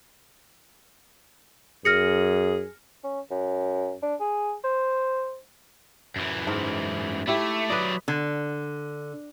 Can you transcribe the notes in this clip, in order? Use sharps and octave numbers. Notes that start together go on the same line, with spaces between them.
F#2 G#4 F6 A#6 C#7
C#4
F#2
D4
G#4
C5
F#2 E3
G#2 A#4
A3 E4 G4
F#3 B4 D5 D#5
D3